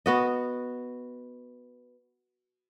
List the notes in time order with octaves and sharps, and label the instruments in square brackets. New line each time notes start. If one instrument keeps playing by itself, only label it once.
[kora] B3 F#4 D#5